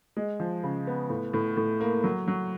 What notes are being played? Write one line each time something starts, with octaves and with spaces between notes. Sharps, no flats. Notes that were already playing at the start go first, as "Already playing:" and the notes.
G#3
F3
C#3
B3
A2
A2
A2
A#3
F#3
F#3